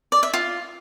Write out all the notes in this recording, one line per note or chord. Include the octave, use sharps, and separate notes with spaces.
D5
E5
F4